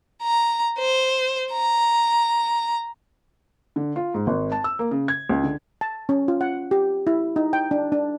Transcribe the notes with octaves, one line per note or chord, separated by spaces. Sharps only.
A#5
C5
A#5
D3
F4
G#2
G#1
A5
E6
A#3
C#3
G#6
C#2
D3
A5
C#4
F4
F#5
G4
E4
D#4
G5
D4
D4